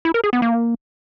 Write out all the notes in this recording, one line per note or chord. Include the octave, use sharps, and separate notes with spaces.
E4
A#4
G#4
B3
A#3